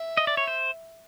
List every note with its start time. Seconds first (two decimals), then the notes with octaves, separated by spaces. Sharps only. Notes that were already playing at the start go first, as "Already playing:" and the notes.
Already playing: E5
0.17 D#5
0.27 D5
0.37 C#5
0.47 C5